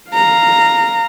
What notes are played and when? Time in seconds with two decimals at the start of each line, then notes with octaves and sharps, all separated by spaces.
0.10 F5 A#5